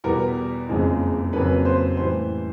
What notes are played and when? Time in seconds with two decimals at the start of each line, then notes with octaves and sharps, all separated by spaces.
0.04 E2 B2 G3 B3 A#4
0.69 F#1 F2 C#3 F3 G#3
1.33 F2 C#3 F#3 A#3 C#4 B4
1.65 C5
1.97 A2 E3 G3 C5